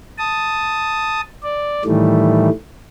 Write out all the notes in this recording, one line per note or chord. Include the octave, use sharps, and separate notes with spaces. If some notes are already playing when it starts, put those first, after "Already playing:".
A5 D#6
D5
A2 D#3 E3 G3 A3